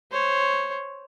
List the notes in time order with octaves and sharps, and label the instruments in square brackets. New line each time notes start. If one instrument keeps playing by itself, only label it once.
[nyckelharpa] C5 C#5